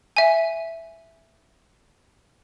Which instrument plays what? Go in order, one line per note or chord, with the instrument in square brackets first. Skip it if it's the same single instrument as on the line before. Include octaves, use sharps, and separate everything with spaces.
[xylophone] E5 G#5